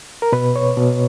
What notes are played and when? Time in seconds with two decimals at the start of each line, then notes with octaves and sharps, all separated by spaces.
0.22 A#4
0.32 B2 B4
0.56 C#5
0.77 B2